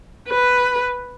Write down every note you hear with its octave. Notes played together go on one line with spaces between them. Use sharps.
B4